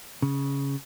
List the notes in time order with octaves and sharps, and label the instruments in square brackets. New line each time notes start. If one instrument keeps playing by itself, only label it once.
[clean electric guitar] C#3